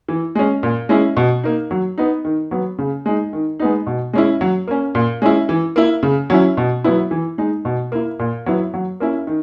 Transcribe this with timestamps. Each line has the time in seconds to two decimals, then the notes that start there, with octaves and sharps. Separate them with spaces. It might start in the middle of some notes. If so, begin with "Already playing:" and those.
0.08 E3
0.35 G#3 C#4
0.63 A#2
0.89 G#3 C#4 E4
1.17 B2
1.44 A#3 D#4
1.71 F#3
1.98 B3 D#4
2.25 D#3
2.51 F#3 B3
2.78 C#3
3.06 G#3 D#4
3.33 D#3
3.60 G#3 B3 D#4
3.86 B2
4.13 G#3 C#4 E4
4.41 F#3
4.68 A#3 C#4
4.95 A#2
5.22 G#3 C#4 E4
5.49 E3
5.76 A#3 E4
6.03 C#3
6.30 F#3 C#4 E4
6.57 B2
6.84 F#3 B3 E4
7.11 E3
7.38 G#3 D#4
7.65 B2
7.92 A#3 E4
8.19 A#2
8.46 F#3 B3 E4
8.74 F#3
9.00 A#3 C#4 E4
9.27 D#3